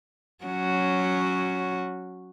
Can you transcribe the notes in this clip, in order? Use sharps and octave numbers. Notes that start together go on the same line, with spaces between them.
F#3 C#4 F#4